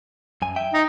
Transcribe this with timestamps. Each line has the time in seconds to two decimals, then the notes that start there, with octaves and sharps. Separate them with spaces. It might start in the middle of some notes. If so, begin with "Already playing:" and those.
0.42 F#2 G#5
0.56 E5 G5
0.73 D#4